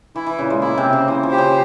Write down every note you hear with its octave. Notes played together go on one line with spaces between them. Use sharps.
E3 E4
E3
A#2 C#3
G#3
A#3 E4
C3
C4
C#3
E3 C5
F3
G4
C#3